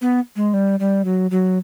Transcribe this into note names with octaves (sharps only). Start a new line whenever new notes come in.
B3
G#3
G3
G3
F#3
F#3